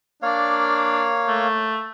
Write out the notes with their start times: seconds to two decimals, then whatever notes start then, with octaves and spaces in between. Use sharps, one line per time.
0.22 A#3 D4 C#5 F5
1.28 A3